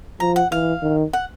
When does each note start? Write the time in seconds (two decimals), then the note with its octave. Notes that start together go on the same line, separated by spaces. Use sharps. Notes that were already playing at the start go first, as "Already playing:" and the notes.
0.20 F3 A#5
0.36 F#5
0.52 E3 F5
0.82 D#3
1.13 F#5